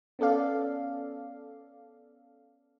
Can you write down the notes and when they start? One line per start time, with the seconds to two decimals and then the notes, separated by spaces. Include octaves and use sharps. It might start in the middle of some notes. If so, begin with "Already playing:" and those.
0.19 B3 C#4 A4 D5 F5